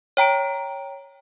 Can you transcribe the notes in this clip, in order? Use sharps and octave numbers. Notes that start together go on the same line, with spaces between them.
C#5 G5 A#5 D7